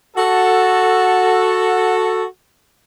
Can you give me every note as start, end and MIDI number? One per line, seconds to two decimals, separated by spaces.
0.17 2.24 66
0.17 2.24 69